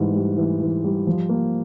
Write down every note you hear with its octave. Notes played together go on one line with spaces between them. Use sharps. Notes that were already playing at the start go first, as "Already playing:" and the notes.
Already playing: G#2 E3 G3
G3
E3
E3
G3
F3
A#3